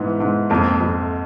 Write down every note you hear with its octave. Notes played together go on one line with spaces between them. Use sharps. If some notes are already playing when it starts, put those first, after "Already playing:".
Already playing: G#2 E3 B3
G#2
F2 A#3
F2